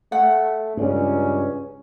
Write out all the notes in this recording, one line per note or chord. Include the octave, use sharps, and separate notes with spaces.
A3 F#5
C#2 G2 C#4